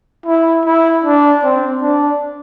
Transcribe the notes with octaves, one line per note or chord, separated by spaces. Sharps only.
E4
E4
D4
C4
D4